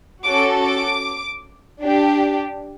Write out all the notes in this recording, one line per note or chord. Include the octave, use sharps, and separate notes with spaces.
C#4 F#4 A4 D6
D6
D4 G4